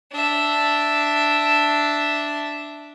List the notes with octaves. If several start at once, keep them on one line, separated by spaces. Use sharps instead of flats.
D4 E5